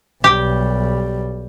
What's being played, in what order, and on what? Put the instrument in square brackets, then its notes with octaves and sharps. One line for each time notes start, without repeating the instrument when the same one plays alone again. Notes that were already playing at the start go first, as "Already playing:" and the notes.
[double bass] B1 G3 [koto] G4